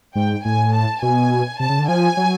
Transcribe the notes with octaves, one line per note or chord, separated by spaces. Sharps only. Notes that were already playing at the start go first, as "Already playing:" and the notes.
G#2 G5
A2 G#5
A5
B2 G#5
C3 A5
C#3
D3
F3 G#5
F#3